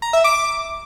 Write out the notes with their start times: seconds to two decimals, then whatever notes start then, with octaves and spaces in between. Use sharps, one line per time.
0.02 A#5
0.13 E5
0.24 D6